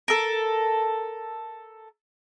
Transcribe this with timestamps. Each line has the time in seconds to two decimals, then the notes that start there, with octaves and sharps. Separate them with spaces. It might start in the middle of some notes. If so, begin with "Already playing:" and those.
0.08 A4 A#4